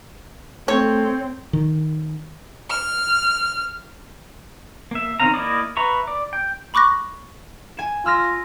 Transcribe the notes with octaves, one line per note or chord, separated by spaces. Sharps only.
A3 C4 C#5
D#3
F6
A#3 E5
D#3 C4 C#4 F5 A#5
A#3 E4 D5 D#5
B4 E5 A#5 C#6
D5
G5
B5 C#6 D6 F#6 A#6
G#5 E7
F4 E6 F6 A#6